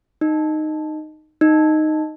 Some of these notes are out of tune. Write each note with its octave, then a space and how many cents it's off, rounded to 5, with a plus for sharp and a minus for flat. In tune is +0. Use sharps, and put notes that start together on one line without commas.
D#4 -10
D#4 -5